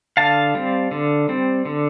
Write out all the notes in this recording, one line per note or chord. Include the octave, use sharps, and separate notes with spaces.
D3 F5 A5
G3 C4
D3
G3 C4
D3